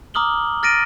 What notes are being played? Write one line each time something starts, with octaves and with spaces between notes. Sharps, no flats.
A#5 D6 D#6 F6 F#7 G7
F6 A6 A#6 D7 D#7